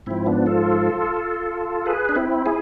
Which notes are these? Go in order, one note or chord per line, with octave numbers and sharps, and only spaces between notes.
G#2 F3 C4 E4
B3 D4
F4 A4
G#4 B4
D4
C4 E4
E4 G#4